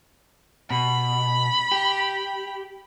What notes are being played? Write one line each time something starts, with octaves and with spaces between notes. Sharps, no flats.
B2 B5
G4